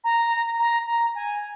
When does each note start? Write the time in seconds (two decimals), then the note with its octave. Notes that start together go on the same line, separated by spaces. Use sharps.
0.04 A#5
0.59 A#5
0.87 A#5
1.15 G#5